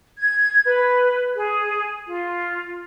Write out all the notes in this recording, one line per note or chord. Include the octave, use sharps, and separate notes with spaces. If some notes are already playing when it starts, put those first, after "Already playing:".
G#6
B4
G#4
F4